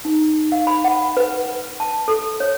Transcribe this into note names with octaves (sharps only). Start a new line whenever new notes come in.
D#4
F5
B5
F#5
B4
A5
A4
C#5